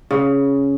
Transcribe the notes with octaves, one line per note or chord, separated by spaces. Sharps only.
C#3